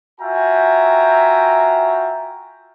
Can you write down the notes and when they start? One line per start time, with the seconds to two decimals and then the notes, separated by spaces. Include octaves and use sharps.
0.20 F4 F#4 E5 G5 G#5 A#5